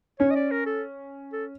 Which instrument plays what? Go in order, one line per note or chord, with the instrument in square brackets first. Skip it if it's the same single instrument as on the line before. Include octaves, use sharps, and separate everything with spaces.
[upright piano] C#4 [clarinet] C#5
[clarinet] D#5
D5
A#4
A4
A4